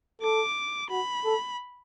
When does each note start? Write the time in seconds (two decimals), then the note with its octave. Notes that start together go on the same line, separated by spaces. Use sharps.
0.22 A4 D6
0.90 F#4 B5
1.25 A4